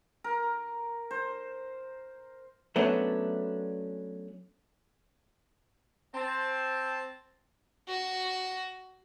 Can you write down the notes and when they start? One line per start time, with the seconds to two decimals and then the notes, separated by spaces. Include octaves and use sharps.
0.24 A#4
1.11 C5
2.76 F#3 A3 B3 C#4 D4
6.15 C4 A5
7.87 F#4